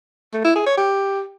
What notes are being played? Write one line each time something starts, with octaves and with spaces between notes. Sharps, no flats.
A3
E4
G#4
C#5
G4